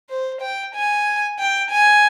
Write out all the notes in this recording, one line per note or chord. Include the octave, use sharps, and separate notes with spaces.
C5
G5
G#5
G5
G#5